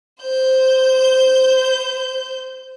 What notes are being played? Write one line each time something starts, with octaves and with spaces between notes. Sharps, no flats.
C5 G6